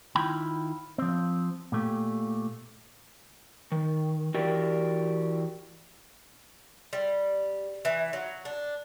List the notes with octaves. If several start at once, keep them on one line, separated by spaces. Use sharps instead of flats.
D#3 E4 F4 G5 B5
F3 C4
A#2 A3 G4
D#3
E3 E4 F#4 G4 A#4 D5
G3
E3
F#3
D4